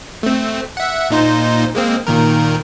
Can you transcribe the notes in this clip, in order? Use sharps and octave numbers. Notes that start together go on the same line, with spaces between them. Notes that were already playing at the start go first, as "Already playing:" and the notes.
A3 C4
E5 F#5
A#2 D#4 C5
G#3 A#3 C4
A#2 D#3 A#4